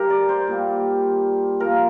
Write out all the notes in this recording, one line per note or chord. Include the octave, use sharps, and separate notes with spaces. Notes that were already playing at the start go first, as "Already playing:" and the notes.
Already playing: G2 G4 A#4
D5
C5
A#2 G3
A#2 F3 A#4